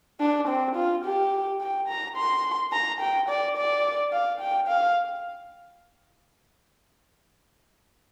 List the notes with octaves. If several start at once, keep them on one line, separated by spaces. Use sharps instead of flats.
D4
C4
F4
G4
G5
A#5
C6
A#5
G5
D5
D5
F5
G5
F5